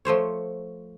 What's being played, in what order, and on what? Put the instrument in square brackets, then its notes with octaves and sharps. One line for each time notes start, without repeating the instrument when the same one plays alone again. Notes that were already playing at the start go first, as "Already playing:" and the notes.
[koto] F3 A3 C5 C#5